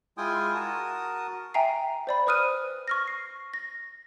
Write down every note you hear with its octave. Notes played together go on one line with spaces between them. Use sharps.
G#3 E4 F4 G5 G#5 D#6
F#4 A#4 A5 D#6
E5 G5 G#5 A#5 C7
C5 D5 B5
B4 C5 D#6 F6 F#6 D#7
C#6 F6 A#6
C7
A#6